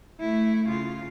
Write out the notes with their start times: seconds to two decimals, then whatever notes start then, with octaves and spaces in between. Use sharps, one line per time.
0.21 A3 E4
0.67 C#3 F4